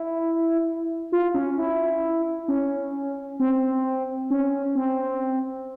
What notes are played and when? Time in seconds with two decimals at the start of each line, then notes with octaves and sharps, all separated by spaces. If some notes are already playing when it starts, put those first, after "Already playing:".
Already playing: E4
1.12 F4
1.34 C#4
1.58 E4
2.48 C#4
3.40 C4
4.30 C#4
4.75 C4